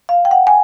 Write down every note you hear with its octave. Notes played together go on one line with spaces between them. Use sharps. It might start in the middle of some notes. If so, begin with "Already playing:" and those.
F5
G5
F#5
G#5